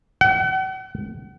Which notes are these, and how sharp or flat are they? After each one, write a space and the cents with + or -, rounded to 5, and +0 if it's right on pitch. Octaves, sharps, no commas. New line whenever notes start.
F#5 +40